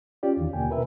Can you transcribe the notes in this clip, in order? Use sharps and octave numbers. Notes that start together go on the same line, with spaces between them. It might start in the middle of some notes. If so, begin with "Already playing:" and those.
C#4 F4 G4 D5
E2 D#3
D#2 B2 D3 A#3 G5 G#5
B2 A#4 B4 E5